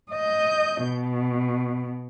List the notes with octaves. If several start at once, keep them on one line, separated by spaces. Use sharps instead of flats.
D#5 G6
B2